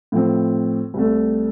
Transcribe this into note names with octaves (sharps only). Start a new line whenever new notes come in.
A2 F3 C4
C2 C3 A3